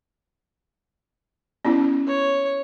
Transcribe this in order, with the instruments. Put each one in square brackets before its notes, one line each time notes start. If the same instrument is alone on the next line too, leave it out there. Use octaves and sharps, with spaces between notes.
[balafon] B3 C#4 E4
[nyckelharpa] C#5